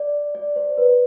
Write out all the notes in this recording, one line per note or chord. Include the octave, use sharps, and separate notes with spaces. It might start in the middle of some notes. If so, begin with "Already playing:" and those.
Already playing: D5
D5
C5
B4